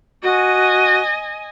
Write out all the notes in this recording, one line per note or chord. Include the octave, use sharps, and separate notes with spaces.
F#4 D#5 G#5